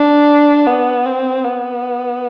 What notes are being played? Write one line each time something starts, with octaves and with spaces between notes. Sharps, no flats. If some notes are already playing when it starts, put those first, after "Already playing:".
Already playing: D4
B3
C4
B3